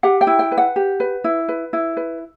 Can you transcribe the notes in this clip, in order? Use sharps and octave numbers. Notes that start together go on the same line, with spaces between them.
G4 F#5
G5
E4
G5
B4
F#5
G4
B4
E4
B4
E4
B4